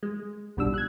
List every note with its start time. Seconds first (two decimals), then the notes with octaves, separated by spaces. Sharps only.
0.03 G#3
0.57 A#1 B2 G3 D4 E6
0.74 F#6 G#6